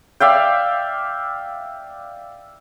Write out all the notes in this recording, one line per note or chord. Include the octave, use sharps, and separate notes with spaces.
D5 E5 F5 G5